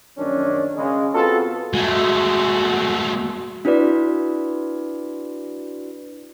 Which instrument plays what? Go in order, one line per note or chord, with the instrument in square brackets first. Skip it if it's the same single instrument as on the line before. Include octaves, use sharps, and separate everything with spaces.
[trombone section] A#1 F#2 D#3 C#4 D4
C#3 G#3
B3 C4 F4 F#4 G#4 A4
[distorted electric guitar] G#3 A3 [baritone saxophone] F#4
[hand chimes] D4 E4 F#4 B4 D5